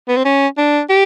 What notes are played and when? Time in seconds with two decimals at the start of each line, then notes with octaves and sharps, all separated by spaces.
0.08 B3
0.17 C4
0.25 C#4
0.58 D4
0.90 G4